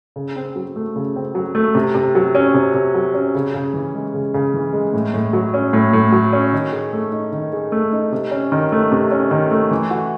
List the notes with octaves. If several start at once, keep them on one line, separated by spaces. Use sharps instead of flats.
C#3
C4
F#3
A3
C#3
C4
F#3
A3
C3
C3
F#3
C#4
C3
C3
F#3
C#4
C#3
C#3
E3
G#3
C#3
C#3
E3
G#3
A2
A2
F#3
C#4
A2
A2
F#3
C#4
D#3
G#4
A3
D#4
D#3
G#4
A3
D#4
C3
C#4
D#3
A3
C3
C#4
D#3
A3
E3
F#4